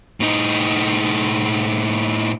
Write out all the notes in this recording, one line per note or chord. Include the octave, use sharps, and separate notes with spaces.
A2 D#4